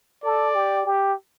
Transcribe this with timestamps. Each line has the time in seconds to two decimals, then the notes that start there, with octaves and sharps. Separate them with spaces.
0.24 A4 D5
0.55 G4
0.85 G4